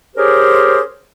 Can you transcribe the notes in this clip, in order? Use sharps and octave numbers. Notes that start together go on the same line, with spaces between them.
C#4 G4 G#4 A#4 C5